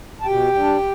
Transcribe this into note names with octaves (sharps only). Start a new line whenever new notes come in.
A5
B2 G4 G5
G3 D4